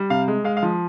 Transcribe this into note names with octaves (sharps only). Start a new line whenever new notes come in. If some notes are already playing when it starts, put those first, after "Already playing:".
Already playing: G3
C3 F5
G#3
G#3 F5
F5
F3